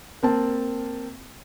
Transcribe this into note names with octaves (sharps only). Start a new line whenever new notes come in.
A#3 C4 A5